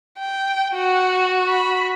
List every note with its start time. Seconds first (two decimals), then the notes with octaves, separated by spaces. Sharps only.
0.19 G5
0.76 F#4 F#5
1.49 B5